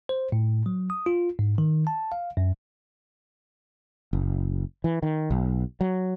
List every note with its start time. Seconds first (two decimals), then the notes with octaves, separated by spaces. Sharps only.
0.09 C5
0.32 A2
0.66 F#3
0.90 D#6
1.06 F4
1.39 G#2
1.58 D#3
1.87 A5
2.12 F5
2.37 F#2
4.13 F#1
4.84 E3
5.03 D#3
5.30 B1
5.81 F#3